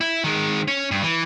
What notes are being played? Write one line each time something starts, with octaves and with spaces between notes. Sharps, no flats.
E4
D#3 G#3
C#4
G2
E3